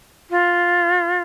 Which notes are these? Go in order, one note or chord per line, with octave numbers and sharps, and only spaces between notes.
F4